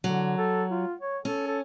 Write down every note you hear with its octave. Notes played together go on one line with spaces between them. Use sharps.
D3 F#3
A4
F4
C#5
C#4 A4
A4